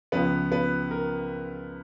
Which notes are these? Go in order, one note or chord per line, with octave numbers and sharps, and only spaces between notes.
C#2 C#3 F3 B3 B4
B3 B4
A#4